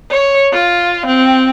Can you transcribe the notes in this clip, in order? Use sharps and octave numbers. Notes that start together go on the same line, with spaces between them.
C#5
F4
C4